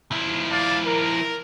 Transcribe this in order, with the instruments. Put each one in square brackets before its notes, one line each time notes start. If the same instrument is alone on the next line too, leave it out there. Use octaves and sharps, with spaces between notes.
[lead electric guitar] F3 E4
[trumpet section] D5 F5 A5
A#4